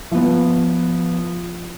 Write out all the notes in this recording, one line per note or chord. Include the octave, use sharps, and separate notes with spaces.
F3 B3